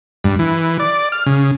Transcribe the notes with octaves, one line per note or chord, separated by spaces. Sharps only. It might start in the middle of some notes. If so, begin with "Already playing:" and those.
G2
E3
D5
F6
C#3